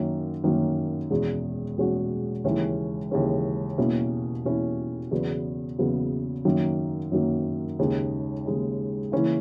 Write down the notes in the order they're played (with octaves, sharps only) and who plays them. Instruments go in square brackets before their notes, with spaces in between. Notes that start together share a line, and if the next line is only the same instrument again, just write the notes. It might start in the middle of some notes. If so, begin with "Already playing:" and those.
Already playing: [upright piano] F#2 D#3 A#3 C#4 F#4
F#2 D#3 A#3 C#4 F#4
E2 B2 G#3 C#4 F#4
E2 B2 G#3 C#4 F#4
D#2 C#3 E3 G#3 C#4
D#2 C#3 E3 G#3 C#4
E2 B2 A#3 C#4 E4
E2 B2 A#3 C#4 E4
E2 C#3 F#3 B3
E2 C#3 F#3 B3
F#2 D#3 F#3 A#3
F#2 D#3 F#3 A#3
D#2 C#3 G#3 D#4
D#2 C#3 G#3 D#4
C#3 E3 A#3 C#4 E4